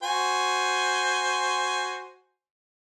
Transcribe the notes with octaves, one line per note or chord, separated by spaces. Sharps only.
F#4 C5 G#5